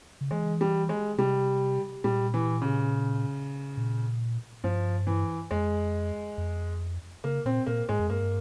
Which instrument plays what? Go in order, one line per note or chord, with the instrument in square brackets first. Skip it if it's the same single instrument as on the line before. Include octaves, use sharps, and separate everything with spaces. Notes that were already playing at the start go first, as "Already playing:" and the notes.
[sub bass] C#3
[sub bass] E3 [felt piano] G#3
[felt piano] G3
G#3
[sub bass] C3 [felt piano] G3
[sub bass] A#2 [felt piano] G3
[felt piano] E3
C#3
[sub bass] A#2
[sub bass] G2 [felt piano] F3
[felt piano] E3
[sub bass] F2 [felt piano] G#3
[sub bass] F2
[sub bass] C#3 [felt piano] A#3
[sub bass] A#2 [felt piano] C4
[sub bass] A#2 [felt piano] A#3
[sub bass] G#2 [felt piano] G#3
[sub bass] F2
[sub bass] G2 [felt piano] A#3